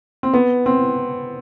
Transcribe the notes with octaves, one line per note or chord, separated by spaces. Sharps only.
C4
B3
C4